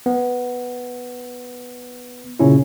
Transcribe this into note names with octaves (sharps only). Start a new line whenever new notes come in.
B3
A#2 C#3 C#4 E4